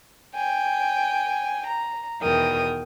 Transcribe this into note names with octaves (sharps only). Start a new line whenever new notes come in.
G5 G#5
A#5
E2 B2 D#3 A#4 G5 D#6